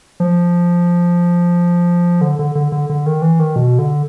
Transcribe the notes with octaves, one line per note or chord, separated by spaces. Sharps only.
F3
D3
D3
D3
D3
D3
D#3
E3
D#3
B2
D3